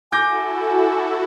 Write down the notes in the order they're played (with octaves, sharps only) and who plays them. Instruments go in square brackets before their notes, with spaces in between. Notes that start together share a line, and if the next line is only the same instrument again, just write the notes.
[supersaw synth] E4 F#4 A4 [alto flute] G#5 [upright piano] D6 G6 A#6